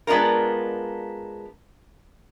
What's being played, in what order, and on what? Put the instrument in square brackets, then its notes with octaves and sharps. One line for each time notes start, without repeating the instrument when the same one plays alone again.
[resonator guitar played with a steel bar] G#3 B3 D4 F4 A#4